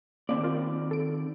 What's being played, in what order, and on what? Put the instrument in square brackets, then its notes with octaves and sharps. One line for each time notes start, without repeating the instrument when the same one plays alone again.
[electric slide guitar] D#3 C4 D5 [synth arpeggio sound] A#3
[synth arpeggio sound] F4 A#4
A4 D7